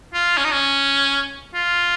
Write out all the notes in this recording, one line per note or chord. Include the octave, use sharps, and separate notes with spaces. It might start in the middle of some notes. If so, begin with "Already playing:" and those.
F4
C#4
D#4
C#4
F4